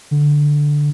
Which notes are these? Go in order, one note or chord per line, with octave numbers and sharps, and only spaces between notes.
D3